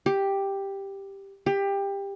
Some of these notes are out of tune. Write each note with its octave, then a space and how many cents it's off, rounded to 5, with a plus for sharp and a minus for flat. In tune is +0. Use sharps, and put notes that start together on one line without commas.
G4 +5
G4 +20